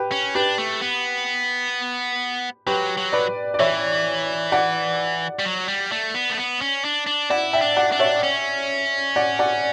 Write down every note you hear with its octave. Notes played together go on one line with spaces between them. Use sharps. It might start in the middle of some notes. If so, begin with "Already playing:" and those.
Already playing: G4 B4
C#4
D4 G4 B4
A3
B3
F#3 G4 B4
F#3
B4 D5
D5
E3 C#5 E5
D5 F#5
G3
F#3
G3
A3
B3
A3
B3
C#4
D4
D4
E4 D5 F#5
E5 G5
D4
D5 F#5
D4
C#5 E5
C#4
D5 F#5
D5 F#5